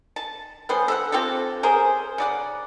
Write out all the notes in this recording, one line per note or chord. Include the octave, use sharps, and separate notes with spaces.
A5
G3 B3 C#4 C5
A4 E5 F#5
C4 F4 G4 A4
C#4 G#4 A#4 C5
C#3 D5 F#5